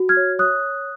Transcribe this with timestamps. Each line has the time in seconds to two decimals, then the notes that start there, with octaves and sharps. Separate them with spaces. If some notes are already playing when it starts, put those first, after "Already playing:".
Already playing: F#4
0.09 F6 G#6
0.17 C#5
0.39 C#5 D#6 F#6